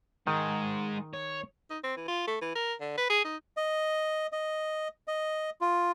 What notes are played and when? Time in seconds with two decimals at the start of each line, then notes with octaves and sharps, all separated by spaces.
0.27 G#2 D#3 G#3
1.13 C#5
1.70 D#4
1.84 C4
1.97 E3
2.08 F4
2.27 A3
2.42 E3
2.55 A#4
2.81 D3
2.98 B4
3.10 G#4
3.25 D#4
3.57 D#5
4.32 D#5
5.08 D#5
5.61 F4